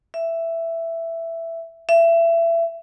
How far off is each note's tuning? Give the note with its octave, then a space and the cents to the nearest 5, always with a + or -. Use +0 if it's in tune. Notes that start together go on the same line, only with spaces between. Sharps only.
E5 +10
E5 +25